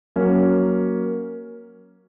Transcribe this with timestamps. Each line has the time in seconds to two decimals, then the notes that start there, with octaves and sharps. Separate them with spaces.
0.16 F#3 A#3 C#4